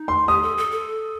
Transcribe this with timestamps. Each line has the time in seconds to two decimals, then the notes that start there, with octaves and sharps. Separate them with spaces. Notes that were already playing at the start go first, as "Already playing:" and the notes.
Already playing: D#4
0.08 C6
0.28 G4 D#6
0.43 A4
0.57 A4
0.72 A4